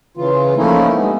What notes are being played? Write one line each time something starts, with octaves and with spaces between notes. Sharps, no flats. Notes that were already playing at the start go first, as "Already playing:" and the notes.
C#3 E3 F4
F3 A3 A#3 C#4 D#4 E4
G2 G#3 B3